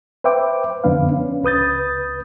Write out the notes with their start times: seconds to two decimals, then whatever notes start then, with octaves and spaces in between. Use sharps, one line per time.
0.24 B4 C5 E5 G5 D6
0.84 F2 D3 B3 D4 B4 F5
1.12 C#4
1.43 C#2 B4 D#6 G6 A6